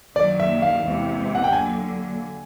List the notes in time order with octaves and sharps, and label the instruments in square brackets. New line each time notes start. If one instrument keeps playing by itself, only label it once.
[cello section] F#2 D#3 F#3 A#3 [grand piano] D5
[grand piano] E5
F5
[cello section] E2 C3 E3 G#3
[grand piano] F#5
G5
[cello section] D3 F#3 A#3 [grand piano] G#5